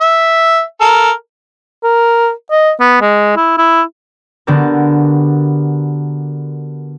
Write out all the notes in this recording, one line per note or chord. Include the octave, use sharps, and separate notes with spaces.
E5
A4 A#4
A#4
D#5
B3
G#3
E4
E4
D3 B3 D4 F#4 G4 A#4